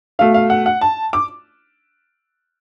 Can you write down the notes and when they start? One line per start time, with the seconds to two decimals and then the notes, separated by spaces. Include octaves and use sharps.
0.19 B2 A3 F5
0.34 F5
0.50 F#5
0.66 F#5
0.81 A5
1.13 D6